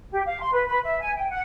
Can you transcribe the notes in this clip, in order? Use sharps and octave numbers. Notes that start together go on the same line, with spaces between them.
G4
F5
C6
B4
B4
E5
G#5
G5
F#5